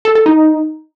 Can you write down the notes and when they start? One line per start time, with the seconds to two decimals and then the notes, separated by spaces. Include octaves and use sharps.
0.05 A4
0.15 A4
0.26 D#4